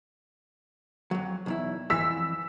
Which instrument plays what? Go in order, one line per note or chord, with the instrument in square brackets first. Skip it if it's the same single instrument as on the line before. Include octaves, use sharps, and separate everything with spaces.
[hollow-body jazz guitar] F2 F#3
B1 E2 E4
[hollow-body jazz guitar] F2 E3 [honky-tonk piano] E6 B6